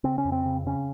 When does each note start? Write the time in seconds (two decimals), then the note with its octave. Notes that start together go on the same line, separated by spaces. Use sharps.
0.04 C#3 C4
0.18 C#4
0.25 F2
0.32 C4
0.46 C#3
0.66 C#3 C#4